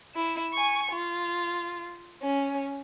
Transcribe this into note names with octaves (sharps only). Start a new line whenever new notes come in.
E4 E7
G#5 C#6
F4
C#4